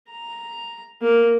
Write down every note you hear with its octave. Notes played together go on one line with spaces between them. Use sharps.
A#5
A#3